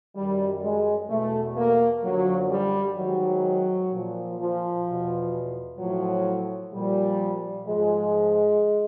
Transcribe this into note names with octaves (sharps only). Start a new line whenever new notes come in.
F#2 D#3 G3
G#3
E2 B2 A3
A#3
F#2 D3 F3 F#3
G3
G#2 D#3 F#3
A#2 F3
F3
E2 B2
A2 F3 F#3
A#2 F3 G3
G#2 F3 G#3